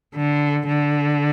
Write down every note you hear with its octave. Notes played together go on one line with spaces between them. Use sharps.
D3
D3